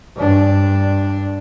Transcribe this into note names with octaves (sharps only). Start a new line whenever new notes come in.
G2 D4